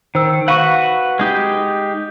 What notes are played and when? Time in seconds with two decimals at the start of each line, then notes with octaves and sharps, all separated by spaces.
0.15 D#3 C5 E6
0.48 F#4 B4 F5 F#5 C#6
1.19 G#3 D#4 G4